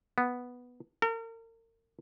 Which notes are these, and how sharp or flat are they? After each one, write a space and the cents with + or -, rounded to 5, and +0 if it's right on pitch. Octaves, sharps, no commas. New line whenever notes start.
B3 +0
A#4 -40